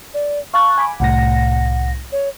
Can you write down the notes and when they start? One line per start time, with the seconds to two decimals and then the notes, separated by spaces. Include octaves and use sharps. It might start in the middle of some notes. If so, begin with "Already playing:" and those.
0.14 D5
0.54 F5 A5 C#6 F#6
0.78 G#5 B5 D6
1.00 C2 A2 F#5 A#6
2.12 C#5